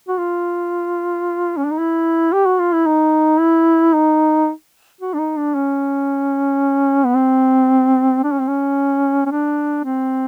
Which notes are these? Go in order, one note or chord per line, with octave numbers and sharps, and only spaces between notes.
F#4
F4
C#4
D4
D#4
E4
G4
F#4
F4
E4
D#4
E4
D#4
F#4
D4
D#4
D4
C#4
B3
C4
D4
C#4
C4
C#4
C#4
D4
C4